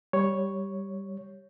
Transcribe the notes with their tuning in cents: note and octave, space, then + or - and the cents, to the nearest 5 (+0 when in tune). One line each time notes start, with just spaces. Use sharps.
G3 +0 C#5 +0